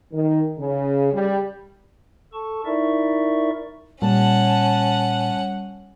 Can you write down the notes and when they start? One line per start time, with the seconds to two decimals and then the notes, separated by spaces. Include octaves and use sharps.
0.13 D#3
0.58 C#3
1.13 G3
2.33 A4 A5 C#6
2.65 D#4 E4 A#4 D5 E5 C#6
4.02 A#2 G3 C#4 F#5 A5